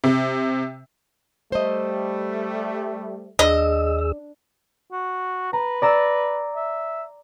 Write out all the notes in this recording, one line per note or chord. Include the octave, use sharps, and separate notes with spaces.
C3
G3 A3 C5 D#5
D#2 D4 G#4 D#5 E6
F#4
B4 A#5
D5 A#5 E6
E5